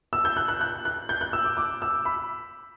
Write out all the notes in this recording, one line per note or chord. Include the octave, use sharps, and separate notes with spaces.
E6
G6
F#6
F#6
F#6
F#6
G6
F#6
E6
D6
D6
E6
B5